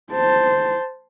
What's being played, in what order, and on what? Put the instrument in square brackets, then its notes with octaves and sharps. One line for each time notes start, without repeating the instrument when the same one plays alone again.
[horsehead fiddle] C5 A5